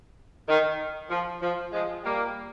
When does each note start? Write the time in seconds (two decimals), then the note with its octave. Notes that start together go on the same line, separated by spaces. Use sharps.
0.48 D#3
1.10 F3
1.41 F3
1.72 F3 G#3
2.04 G3 A#3